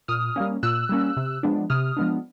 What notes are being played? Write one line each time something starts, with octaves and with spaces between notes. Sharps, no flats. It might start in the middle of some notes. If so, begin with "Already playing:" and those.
A#2 D#6 F6
G3 A#3 C#4
A#2 E6 F#6
G3 A#3 C#4
C3
F3 G#3 B3 D4
C3 D#6 F6
F3 G#3 B3 D4